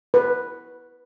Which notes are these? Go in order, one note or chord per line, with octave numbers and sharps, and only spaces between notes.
B4